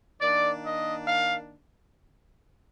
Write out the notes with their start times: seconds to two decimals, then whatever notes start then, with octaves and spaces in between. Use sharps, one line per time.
0.21 D#3 A#3 D4 D5
0.64 D#5
1.06 F5